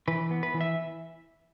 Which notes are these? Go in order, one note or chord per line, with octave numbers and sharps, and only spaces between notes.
E3 B4
B3
B4
E3
E5